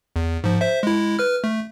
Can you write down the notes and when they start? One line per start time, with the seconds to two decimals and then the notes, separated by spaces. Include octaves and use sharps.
0.16 E2
0.44 G#2 F3
0.61 C5 E5
0.83 G#3 E4
1.19 B4 F6
1.44 A3